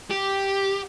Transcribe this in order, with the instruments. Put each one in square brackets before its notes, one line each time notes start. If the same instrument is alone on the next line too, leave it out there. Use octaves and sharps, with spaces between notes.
[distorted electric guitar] G4